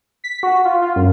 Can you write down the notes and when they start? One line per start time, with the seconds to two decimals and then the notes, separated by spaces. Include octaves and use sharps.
0.24 B6
0.43 F#4
0.65 F4
0.82 F4
0.96 F#2